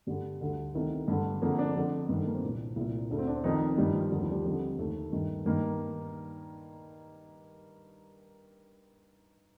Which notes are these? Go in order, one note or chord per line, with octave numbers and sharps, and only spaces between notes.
G2 D3 G3
D2 D3
C2 C3 D#3 A3
G2 D3
F2 D3 A#3
D4
F2 D3
G2 D#3
A3
A#3
C4
C2 A#2 D4
C2 A#2
D2 D3 D4
C4
D4
C4
F2 D#3 D#4
G2 D#3 G3
F3
D#2 D3 G3
F3
G3
F2 D3 G3
D#2 D3 A3
G2 D#3
G2 D#3 A#3